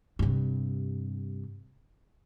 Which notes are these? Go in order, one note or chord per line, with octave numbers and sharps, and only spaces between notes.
G2 C3